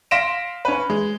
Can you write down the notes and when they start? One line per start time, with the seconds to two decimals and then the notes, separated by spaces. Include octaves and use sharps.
0.11 F5 C6 A#6 B6 D7 E7
0.65 C#4 B4
0.90 G#3